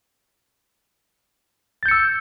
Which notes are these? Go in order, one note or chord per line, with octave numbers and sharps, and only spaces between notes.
E6 G6 A6 C#7